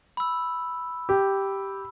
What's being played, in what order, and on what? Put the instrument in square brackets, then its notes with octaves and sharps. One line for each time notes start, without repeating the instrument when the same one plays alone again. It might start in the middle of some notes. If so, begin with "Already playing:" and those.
[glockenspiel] B5 E6
[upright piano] G4